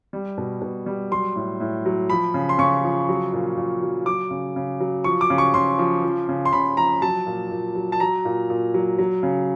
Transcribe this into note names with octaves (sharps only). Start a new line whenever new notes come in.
G3
B2
B2
G3
F#3 C6
A2
A2
F#3
F3 B5
C#3
C6
C#3 C#6
F3
F#3
A#2
A#2
F#3
F#3 D6
C#3
C#3
F#3
F3 C#6
D6
C#3
C#6
C#3 C6
F3
F3
C#3
C6
C#3 B5
F3 A#5
F#3 A5
A#2
A#2
F#3
A5
F#3 A#5
A#2
A#2
F#3
F#3
C#3